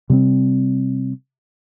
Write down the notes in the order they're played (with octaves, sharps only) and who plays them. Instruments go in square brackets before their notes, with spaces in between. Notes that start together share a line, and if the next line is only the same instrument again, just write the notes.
[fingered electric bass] C3 G3 A3 C4